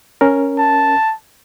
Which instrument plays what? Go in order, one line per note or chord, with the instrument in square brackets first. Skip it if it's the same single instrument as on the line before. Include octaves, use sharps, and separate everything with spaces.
[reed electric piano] C#4 A#4
[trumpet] A5